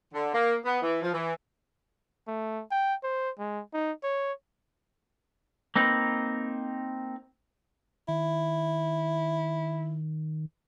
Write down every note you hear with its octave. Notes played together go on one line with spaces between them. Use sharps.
D3
A#3
B3
E3
F3
E3
A3
G5
C5
G#3
D#4
C#5
A#3 C4 D#4 B4
D#3 E4